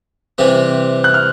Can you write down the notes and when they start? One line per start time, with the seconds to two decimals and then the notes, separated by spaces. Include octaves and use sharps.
0.38 C3 E3 G3 C4
1.04 F#6
1.14 F6